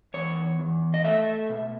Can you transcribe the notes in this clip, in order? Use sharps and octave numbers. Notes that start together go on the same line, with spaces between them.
E2 C#5
E2
D#5
A3 E5
B2